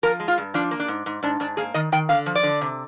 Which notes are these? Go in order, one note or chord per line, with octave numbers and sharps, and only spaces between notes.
F3 A#4
G#3
F4
G2
F3 D4
A#3
D4
G#2
G#2
G#2 D4
G#2 D4
A#3 G#4
D#3 D#5
D#3 G5
D3 F5
F3
D5
D3
C3